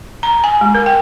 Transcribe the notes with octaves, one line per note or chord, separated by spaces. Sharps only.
A#5
G#5
G#3
A#4
G5